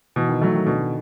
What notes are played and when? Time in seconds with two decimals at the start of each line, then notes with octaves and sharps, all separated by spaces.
0.16 B2 E3
0.29 D#3
0.41 E3 F#3 A3
0.54 D#3
0.66 B2 D3